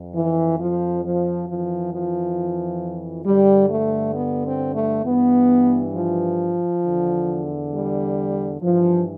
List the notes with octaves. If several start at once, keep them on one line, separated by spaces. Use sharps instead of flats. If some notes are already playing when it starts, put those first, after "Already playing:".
Already playing: F2
E3
F3
F3
F2 E3 F3
F3
G2 D3 G3
A3
B3
C4
A3
G2 E3 B3
F3
E2 D3
G3
G2 E3 F3